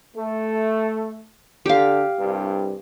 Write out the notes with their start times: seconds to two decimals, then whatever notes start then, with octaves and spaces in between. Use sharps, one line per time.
0.16 A3
1.66 D3 G4 F5
2.19 C2 G2